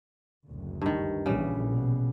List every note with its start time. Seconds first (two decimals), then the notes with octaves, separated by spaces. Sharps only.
0.48 F#1 D2
0.81 G2 D#3
1.26 A#1 A#2 C#3 E3 G3
1.68 B2